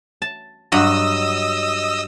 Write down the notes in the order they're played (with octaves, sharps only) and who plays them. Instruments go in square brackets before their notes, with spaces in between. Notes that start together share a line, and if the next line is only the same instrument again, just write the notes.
[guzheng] A5
[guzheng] G2 F#3 F#4 [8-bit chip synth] D#5 D#6 E6